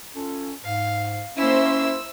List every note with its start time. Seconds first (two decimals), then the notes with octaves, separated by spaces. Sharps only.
0.16 C#4 F4 A4
0.64 G#2 F5
1.37 A#3 C#4 E4 C5 E5 E6